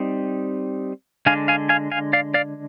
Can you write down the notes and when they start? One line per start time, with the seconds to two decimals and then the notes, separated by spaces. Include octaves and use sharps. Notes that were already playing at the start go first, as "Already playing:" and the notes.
Already playing: G3 C4 D#4
1.26 D3 G#3 D4 F5 G#5
1.48 F5 G#5
1.69 F5 G#5
1.92 F5 G#5
2.13 D5 F5
2.34 D5 F5